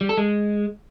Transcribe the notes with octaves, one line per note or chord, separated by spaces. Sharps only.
G3
A4
G#3